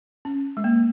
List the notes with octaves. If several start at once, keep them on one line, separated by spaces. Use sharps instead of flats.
C#4
G#3
A#3